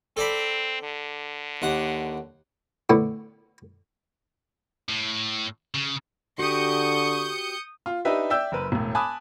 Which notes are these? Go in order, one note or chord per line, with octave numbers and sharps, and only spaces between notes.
C4 A4 D5 B5
D3
D#2 F#5
A2 D3 B3
A2
C#3
D3 F#4 G4 C#6 D#6 G6 C#7
F4
D4 D#4 G4 B4 E5
D5 E5 G5 E6 G6
F#1 A#4 B4
E1 A2
G#5 A5 B5 D6 D#6 F#6